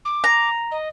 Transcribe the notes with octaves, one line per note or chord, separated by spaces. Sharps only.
D6
A#5
D#5